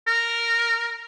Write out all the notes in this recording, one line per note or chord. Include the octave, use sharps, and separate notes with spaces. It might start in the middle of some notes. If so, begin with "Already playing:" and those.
A#4